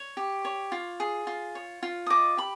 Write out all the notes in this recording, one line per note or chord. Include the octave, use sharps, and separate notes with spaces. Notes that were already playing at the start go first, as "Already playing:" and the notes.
Already playing: C#5
G4
C#5
F4
G#4
F4
C#5
F4
D#6
D#5 D6
G4 B5